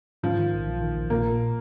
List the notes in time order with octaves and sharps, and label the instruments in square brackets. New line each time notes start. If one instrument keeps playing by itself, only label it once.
[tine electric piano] G#2 [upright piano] F3
[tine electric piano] D#3
A#1
A#1
D#3
A#1
[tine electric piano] A#2 [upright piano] A#3
[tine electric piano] A#2